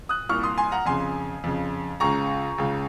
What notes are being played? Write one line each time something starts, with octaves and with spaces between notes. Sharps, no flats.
D#6 F#6
C2 A#2 C#6 F6
C6 D#6
G#5 C6
F#5 A#5
F2 C#3 G#5 C6
F2 C#3
C#2 C#3 A#5 C#6
C#2 C#3